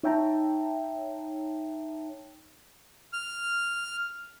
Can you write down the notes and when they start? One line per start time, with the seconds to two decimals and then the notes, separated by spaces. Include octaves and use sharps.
0.03 D#4 C#5 E5 G5 A5 A#5
3.13 F6